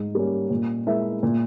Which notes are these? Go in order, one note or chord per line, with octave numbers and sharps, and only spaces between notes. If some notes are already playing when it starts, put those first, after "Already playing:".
Already playing: G#2
G3 A#3 C#4
A#2
G#3 E4 A#4 E5
A#2